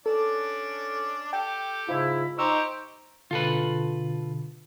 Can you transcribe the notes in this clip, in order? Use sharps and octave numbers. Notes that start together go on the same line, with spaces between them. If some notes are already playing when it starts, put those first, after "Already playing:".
C#4 D4 A4 D5
G4 A4 G5
G#2 C#3 E4 F4
D#4 G4 C5 A#5 C#6 E6
B2 D3 F4 A4 B4